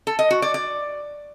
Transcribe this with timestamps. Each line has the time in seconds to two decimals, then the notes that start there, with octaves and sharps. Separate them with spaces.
0.07 A4
0.19 D#5
0.31 F#4
0.42 D5
0.54 D5